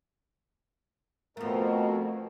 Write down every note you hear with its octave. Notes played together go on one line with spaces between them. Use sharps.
F2 B2 F3 A3 A#4